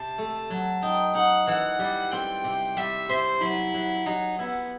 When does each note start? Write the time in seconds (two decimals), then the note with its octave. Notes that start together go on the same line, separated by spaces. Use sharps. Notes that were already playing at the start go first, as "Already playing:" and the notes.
Already playing: C3 A5
0.18 A3
0.50 F#3
0.83 D#4 G5
1.15 D#4 F#5
1.47 E3 F#5
1.79 G3
2.11 C4 G5
2.44 C3
2.77 G3 E5
3.09 C3 C5
3.41 F#3 E4
3.74 F#3
4.06 F#3 D#4
4.39 B3 E4